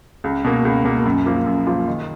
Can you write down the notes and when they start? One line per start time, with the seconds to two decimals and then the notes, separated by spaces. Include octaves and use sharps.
0.24 C#2
0.45 B2 A#3
0.65 C#2
0.84 B2 A#3
1.05 F#2
1.26 F3 A#3 F4
1.46 F#2
1.67 F3 A#3 F4
1.88 D#3